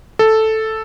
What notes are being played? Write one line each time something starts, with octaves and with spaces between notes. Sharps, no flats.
A4